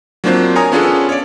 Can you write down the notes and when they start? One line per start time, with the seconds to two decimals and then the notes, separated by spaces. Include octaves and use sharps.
0.24 F#3 A#3 C4 D4 F4 C5
0.56 A#4 C#5 G#5 A#5 D#6
0.72 B3 C#4 D4 F4 G#4 A4
1.09 C#5 D5